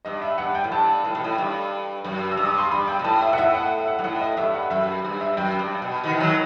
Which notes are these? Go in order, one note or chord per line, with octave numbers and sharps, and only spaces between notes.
G2 D#5
E5
G2 F#5
G5
A2
G2 A5
A2
B2
A2
G2
F#2
E6
G2
D#6
C6
G2 B5
G5
B2
A2 A5
E5
B2 F#5
A2 E5
F#5
E5
F#5
G2
A2 F#5
D#5
G2 E5
F#5
F#2 E5
G2
E5
F#2 G5
G2
B2
B2 D#3
E3
D#3 F#3